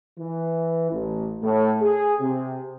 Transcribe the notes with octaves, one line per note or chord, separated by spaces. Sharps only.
E3
A1
A2
G#4
C3